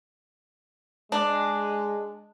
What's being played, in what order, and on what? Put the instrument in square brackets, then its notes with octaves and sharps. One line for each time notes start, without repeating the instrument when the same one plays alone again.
[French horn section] G#3 [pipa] D4